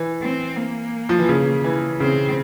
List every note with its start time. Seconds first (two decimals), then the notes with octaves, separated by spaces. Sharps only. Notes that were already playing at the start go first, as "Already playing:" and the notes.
Already playing: E3
0.22 C4
0.57 A#3
1.09 F3
1.19 E3
1.29 C#3
1.64 E3
2.00 C#3 C4